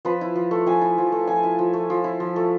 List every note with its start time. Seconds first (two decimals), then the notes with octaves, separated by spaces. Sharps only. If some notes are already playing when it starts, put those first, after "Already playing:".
0.05 F3 B4
0.21 E4
0.36 F3
0.51 A3
0.66 F3 G#5
0.81 E4
0.98 F3
1.12 A3
1.27 F3 G#5
1.43 E4
1.59 F3
1.73 A3
1.90 F3
2.04 E4
2.20 F3
2.36 A3